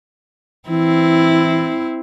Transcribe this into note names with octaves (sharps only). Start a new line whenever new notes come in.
E3 C4 E4